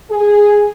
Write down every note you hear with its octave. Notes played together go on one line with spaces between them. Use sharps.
G#4